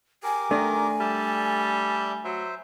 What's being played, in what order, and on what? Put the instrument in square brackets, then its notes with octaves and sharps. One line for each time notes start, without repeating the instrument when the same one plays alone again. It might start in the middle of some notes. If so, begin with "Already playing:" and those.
[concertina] G4 A#4 D6 [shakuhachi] G#5
[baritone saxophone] D#3 [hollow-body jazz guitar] A3 D4
[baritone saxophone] G3 [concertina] D5 E5 A5
[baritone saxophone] F#3 [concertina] C5 E5